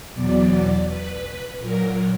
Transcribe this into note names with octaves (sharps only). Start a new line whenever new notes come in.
E2 B2 F#3 D5
B4
A#2 F#3 A#4